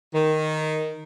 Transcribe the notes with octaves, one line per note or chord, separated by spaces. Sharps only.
D#3